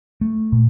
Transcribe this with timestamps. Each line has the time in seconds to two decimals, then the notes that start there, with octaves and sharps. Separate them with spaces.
0.21 A3
0.52 A#2